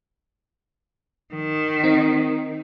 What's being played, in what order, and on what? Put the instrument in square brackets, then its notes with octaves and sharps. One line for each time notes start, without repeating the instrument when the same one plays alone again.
[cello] D#3
[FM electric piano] C4 D#4